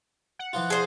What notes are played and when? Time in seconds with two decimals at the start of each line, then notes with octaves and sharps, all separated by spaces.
0.39 F#5
0.53 E3 F3 F4
0.70 G#4 C5